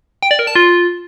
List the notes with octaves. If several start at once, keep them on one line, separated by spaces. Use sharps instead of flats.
G5
D5
A#4
A5
F4